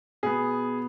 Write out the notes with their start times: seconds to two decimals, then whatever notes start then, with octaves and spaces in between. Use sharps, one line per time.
0.23 B2 B3 G#4